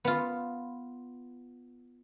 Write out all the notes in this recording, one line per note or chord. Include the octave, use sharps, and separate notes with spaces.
B3 F4